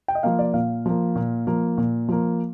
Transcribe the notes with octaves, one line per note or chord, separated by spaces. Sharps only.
G5
D#5
F3 A#3 F5
D5
A#2 F5
F3 A#3
A#2
F3 A#3
A#2
F3 A#3